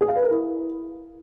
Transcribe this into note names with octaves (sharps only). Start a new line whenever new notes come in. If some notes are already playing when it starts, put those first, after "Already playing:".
G#4
F5
B4
A#4
E4